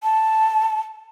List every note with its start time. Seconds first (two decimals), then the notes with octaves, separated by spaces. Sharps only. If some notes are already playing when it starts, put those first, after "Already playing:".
0.03 A5